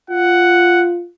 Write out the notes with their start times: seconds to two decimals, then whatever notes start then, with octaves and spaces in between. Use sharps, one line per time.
0.10 F4 F#5